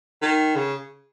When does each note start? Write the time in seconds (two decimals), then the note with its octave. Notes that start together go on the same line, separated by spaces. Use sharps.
0.22 D#3
0.56 C#3